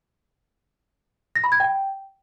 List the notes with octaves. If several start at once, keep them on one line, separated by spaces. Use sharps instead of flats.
A#6
B5
G#6
G5